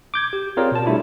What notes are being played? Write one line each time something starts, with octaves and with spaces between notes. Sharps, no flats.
D6 G6 G#6
G4
C4 F4 G#4 A#4 C#5 D5
B2 A5
G3 A3 D4 E4 F4